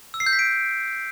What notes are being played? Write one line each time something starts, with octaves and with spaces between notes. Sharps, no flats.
E6
C7
G6
B6
D7